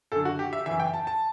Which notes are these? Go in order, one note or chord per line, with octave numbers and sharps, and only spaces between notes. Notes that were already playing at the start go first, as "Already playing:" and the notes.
F#2 D3 A4
F#4
G4
E5
F#2 E3 E5
G5
A5
A5